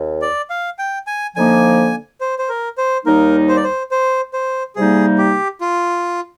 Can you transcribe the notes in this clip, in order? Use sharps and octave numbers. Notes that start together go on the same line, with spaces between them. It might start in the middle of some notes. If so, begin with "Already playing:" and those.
Already playing: D#2
D5
F5
G5
G#5
D3 F3 A#3 D#4 G#5
C5
C5
A#4
C5
D#2 D#3 G3 A#3 D#4 A#4
C5
D5
C5
C5
C5
C3 G3 A#3 D#4 G#4
G4
F4